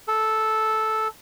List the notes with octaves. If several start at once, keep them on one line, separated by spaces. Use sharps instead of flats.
A4